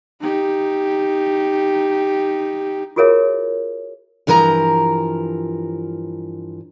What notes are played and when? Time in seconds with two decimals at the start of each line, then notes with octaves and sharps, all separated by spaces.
0.21 D#4 G4
2.96 F4 F#4 G#4 A#4 C#5 E5
4.27 G2 E3 F3 A#4 G#5 A#5